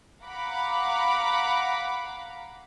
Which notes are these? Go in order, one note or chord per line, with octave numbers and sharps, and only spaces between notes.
F5 F#5 A#5 B5 D6